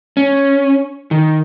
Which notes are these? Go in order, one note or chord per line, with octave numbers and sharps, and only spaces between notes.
C#4
D#3